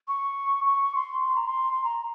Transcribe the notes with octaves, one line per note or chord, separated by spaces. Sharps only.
C#6
C#6
C6
C6
A#5
C6
C6
A#5